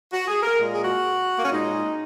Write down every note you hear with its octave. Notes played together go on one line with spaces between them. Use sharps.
F#4
G#4
A#4
A#2 G#3
G#4
F#4
A#3
C#4
A#2 G#3 D#4